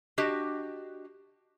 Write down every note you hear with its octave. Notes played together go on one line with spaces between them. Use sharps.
D4 F#4 G4 D#5